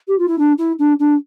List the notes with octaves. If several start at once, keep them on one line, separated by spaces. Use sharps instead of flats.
G4
F4
E4
D4
E4
D4
D4